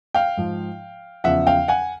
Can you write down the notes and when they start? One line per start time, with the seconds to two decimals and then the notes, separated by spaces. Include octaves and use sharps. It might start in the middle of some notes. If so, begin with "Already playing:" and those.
0.14 F5 G5
0.37 G#2 F3
1.24 E2 C#3 F3 E5 F#5
1.47 F5 G5
1.68 F#5 G#5